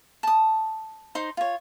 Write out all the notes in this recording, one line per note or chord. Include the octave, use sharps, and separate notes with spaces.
A5 D#6
D#4 C5 C6
F4 C#5